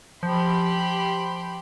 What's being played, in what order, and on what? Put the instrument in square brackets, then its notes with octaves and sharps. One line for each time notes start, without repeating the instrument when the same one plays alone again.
[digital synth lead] F3 [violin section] G4 B5 C6